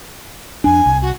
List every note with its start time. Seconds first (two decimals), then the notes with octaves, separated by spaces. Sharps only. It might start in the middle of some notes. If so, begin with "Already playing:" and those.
0.64 F2 D4 G#5
0.86 C2
1.01 F#4